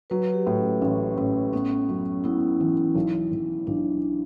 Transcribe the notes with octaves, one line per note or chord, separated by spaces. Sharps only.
F#3 B4
G4
A2
C#4
A1 C#4
A2
B3 C#4
F#2
B3 E4
E3
B1
B1
B1 D4